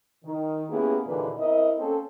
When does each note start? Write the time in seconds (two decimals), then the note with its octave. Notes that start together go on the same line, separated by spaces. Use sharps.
0.25 D#3
0.70 A#3 B3 C#4 E4 G4 G#4
1.06 D#2 A#2 D3 E3 G#3 B4
1.39 C4 E4 A#4 D#5
1.79 A#3 C4 C#4 A4